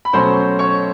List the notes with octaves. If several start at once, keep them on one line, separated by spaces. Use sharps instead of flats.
B5
B2 F#3 A3 C#4 C5 C6
C#5 C#6